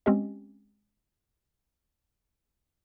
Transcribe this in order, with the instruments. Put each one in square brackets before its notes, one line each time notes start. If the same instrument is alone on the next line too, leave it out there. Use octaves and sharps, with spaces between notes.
[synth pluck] G#3 C4 C#4 G4 D#5